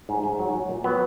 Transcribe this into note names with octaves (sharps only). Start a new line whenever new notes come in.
G#2
G#2
F#3
F#3
A#2
F#3 B3